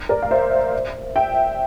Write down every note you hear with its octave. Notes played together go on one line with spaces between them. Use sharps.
A#4 D5
F5
C5 E5
E5 G5